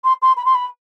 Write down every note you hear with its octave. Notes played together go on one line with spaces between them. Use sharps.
C6
C6
B5
C6
B5